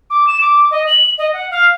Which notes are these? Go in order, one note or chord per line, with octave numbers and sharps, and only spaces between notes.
D6
E7
D6
D#5
F#7
D#5
F#5
F5